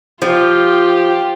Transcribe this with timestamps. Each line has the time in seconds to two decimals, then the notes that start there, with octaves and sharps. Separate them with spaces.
0.22 F3 F4 G4